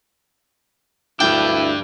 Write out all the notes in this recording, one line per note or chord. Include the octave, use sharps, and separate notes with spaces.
D2 G2 D4 E4 G5